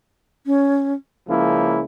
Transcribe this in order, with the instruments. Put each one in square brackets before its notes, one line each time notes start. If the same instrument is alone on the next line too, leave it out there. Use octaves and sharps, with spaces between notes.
[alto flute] C#4
[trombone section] C#2 C#3 F3 A#3 E4